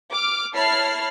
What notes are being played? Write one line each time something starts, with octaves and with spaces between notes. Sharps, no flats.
D6 F6
E4 C#5 A5 B5 F6 C7